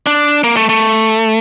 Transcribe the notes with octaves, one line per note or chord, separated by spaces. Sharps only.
D4
A#3
A3
A3